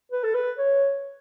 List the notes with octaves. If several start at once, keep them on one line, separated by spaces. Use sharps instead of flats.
B4
A4
B4
C#5